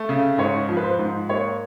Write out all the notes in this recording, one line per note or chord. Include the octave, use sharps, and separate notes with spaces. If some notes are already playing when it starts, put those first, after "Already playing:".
Already playing: A3
C#3
G#2 C#5
F3
B4
C5
G#2
A#3 C#5